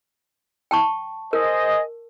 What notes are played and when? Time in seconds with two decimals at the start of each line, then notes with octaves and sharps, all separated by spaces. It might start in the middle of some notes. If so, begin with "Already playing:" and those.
0.71 G5 A5 C#6
1.33 G#4 A#4 C5 D#5